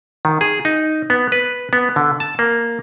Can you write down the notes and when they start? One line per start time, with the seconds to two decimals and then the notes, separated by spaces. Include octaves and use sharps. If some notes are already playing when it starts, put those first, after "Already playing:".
0.25 D#3
0.41 G#4
0.65 D#4
1.10 B3
1.32 B4
1.73 B3
1.96 D3
2.20 A5
2.39 A#3